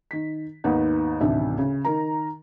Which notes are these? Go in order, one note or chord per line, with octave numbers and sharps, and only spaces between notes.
D#3 B6
D#2 G#2 B3 D#4 F#5
A1 D2 C3 D#3 D4 E5
C#3
D#3 A#4 A#5